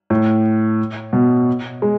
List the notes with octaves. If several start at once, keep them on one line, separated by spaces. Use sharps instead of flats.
A2
B2
G#3